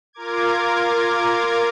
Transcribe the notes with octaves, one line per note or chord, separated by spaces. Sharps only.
F4 A#4 D6 G#6